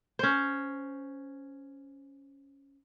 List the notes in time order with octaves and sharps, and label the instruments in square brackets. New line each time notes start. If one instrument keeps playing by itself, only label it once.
[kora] C#4 C5